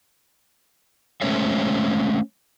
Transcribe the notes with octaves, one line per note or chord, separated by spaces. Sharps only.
G#3 A3 C#4 C5 C#5 E5